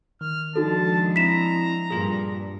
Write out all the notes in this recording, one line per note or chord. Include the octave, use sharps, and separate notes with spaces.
D#3 F6
D3 F3 G#3 D#4 F#4 A4 A5
C4 E4 A#5 B6 E7
G2 A#2 F4 G#4